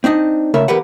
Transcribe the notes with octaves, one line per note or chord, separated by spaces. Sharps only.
C4 D4 D#4 D#5
C#2 C#3 A3 A#4 E5
E2 G4 A#4 B4 F#5